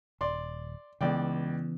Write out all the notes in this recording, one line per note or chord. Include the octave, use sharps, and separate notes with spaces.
D#1 D5 C6
C#2 C#3 E3 B3 D5 G5